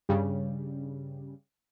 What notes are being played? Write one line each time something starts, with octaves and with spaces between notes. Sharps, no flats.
G2 C#3 G3